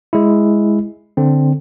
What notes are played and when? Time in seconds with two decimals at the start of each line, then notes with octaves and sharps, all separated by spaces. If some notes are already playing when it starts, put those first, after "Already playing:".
0.13 G#3 E4
1.17 D3 C4